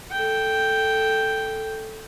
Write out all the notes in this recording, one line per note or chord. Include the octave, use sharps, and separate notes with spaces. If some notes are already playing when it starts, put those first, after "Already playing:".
A4 G5